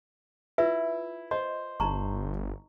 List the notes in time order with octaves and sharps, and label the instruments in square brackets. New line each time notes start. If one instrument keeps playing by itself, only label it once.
[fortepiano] E4 [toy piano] F4 B4 E5
[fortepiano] C5 [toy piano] D#5
[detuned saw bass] G1 [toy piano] D#4 A#5 C#6